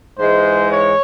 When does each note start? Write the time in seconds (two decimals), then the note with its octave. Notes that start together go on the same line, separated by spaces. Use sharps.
0.18 G#2 E3 G#3 C5
0.70 C#5